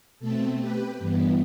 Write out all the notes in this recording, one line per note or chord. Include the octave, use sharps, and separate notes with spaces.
B2 A3 C4 A4
G4 B4
G2 E3 B3